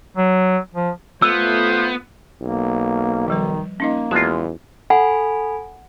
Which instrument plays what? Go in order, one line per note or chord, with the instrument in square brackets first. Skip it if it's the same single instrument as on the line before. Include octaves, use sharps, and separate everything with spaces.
[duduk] F#3
F3
[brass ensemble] A3 F4 [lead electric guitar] B3 [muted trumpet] C5 [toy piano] E6
[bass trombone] B1 [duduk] A#3
[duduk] D#3 [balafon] F3 G3 B4
[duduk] A#3 [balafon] C#4 D#4 D#5
[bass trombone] E2 [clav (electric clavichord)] G#3 F4 [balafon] F#4 A5 C6
[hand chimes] A4 G#5 B5 [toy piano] F#5